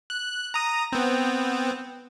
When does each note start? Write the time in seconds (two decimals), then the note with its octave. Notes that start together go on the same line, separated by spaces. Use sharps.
0.10 F#6
0.54 A#5 D#6
0.92 B3 C4